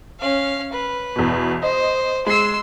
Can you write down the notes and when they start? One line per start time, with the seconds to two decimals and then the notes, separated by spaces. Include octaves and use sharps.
0.19 C#4 F5
0.72 B4
1.16 E2 B2
1.62 C5 D#5
2.26 G#3 C6 E6 C7